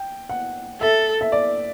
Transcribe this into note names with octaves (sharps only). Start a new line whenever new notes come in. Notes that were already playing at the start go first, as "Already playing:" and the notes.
Already playing: G5
F#5
A4 E5
E5
D5